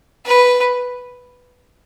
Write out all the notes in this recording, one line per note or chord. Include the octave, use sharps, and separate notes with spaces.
B4